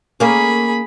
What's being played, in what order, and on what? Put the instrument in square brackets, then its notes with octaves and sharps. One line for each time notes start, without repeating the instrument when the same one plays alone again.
[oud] A#3 C#4 [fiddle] G#4 B5